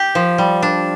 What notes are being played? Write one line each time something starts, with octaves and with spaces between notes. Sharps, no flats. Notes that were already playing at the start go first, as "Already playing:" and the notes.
Already playing: G4
F3
G3
D4